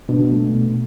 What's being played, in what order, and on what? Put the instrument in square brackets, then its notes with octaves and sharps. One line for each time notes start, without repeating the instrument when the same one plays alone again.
[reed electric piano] B2 [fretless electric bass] D4
[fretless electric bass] A3
B2